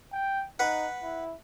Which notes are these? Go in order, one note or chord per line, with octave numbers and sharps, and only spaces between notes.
G5
D#4 B4 F#5
E4